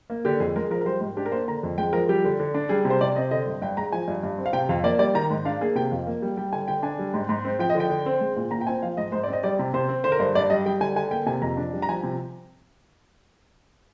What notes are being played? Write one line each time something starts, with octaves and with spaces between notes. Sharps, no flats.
A#3
D3 G4
F2 G#4
G#3 A#4
F3 A#4
A#4
G3 C5
G#2
D4 G4
A#4
A#3 C5
D3 A#5
F2
G#3 G5
F3 A#4
G3 G4
D3
D3
D4
G3 G#4
C3
C5
C3 D5
C4 D#5
D3 D#5
G2
G2 G5
G#3 A#5
F3 G#5
G2
G2
C4
F5
C3 G5
F2 F5
A#3 D5
G3 D5
D#3 A#5
G#2
D4 F5
A#3 G#4
C3 G5
F2 F5
A#3
G3
G3 G5
D3 G#5
D3 G5
D4 G#5
G3
G#2
G#2
C4
F3 G5
D#5
D3
G5
D3
C4
G#3
A#2
A#2 A#5
G5
C4 G#5
F3 F5
G#2 D#5
G#2 C5
D5
C4 D#5
G3 D5
C3
C3 C5
C4
D3 C5
A#4
G2 C5
G2 D5
G3 D#5
G3 G5
D3 G#5
D3 G#5
A#3 G5
C3 G#5
F2 A#5
D4
G3
A#5
F3 G#5
C3